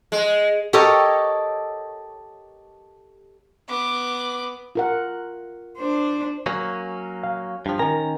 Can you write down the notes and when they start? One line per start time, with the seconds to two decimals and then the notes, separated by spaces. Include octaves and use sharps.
0.12 G#3
0.73 G4 A4 A#4 C#5 D#5
3.69 B3 D6
4.75 F4 A#4 F#5
5.78 D4 C5
6.46 F#3 A#3 C#4
7.23 F5
7.66 G2 F3
7.79 D#3 C#4 A#4 G#5 A#5